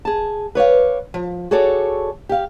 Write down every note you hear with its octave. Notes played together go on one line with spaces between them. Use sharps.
G#4 A5
B4 C#5 D5 F5
F3
F#4 G#4 A4 C#5 D5
G4 F5